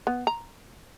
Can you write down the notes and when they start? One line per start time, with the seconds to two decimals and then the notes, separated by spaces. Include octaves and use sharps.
0.07 B3
0.27 A#5